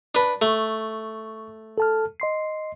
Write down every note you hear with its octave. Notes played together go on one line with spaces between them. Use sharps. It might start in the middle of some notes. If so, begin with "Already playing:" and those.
D4 B4
A3 C#6
A4 A5 F6
D#5 C6 C7